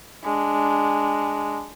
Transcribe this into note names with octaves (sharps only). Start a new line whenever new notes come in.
G#3 D4